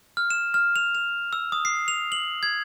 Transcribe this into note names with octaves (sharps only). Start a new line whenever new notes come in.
F6
E7
F6
F7
F7
E6
D#6
C7
F7
F#7
G#6